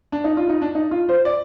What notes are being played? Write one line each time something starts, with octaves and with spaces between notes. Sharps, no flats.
D4
D#4
F4
D#4
D4
D#4
F4
C5
D5